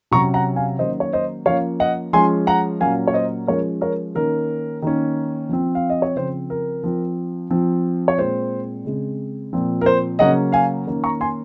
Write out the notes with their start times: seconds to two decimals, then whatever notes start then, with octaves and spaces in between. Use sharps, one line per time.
0.11 C3 F#3 C#4 A#5 C#6
0.34 F#5 A#5
0.56 F5 G#5
0.79 D#3 F#3 A#3 C#4 C5 D#5
1.00 C#5
1.13 C5 D#5
1.46 F3 A#3 C#4 C#5 F5
1.80 D#5 F#5
2.13 F3 G#3 C#4 G#5 C6
2.47 F#5 A#5
2.80 A#2 F#3 A#3 C#4 F5 G#5
3.07 C#5
3.14 C5 D#5
3.47 F3 G#3 C#4 A#4 C#5
3.81 A#4 C#5
4.15 D#3 A#3 C#4 A#4
4.82 D#3 A#3 C#4
5.49 F3 C4
5.75 F5
5.90 D#5
6.02 C#5
6.16 C#3 F3 C4 C5
6.50 A#4
6.83 F3 C4
7.50 F3 C4
8.08 C#5
8.17 A#2 G#3 C4 C5
8.85 C#3 G#3 C4
9.53 A#2 F3 C4
9.81 A#4
9.86 C5
10.19 C#3 F#3 A#3 C#4 D#5 F#5
10.52 F5 G#5
10.87 D#3 A#3 C#4
11.04 A#5 C#6
11.21 G#5 C6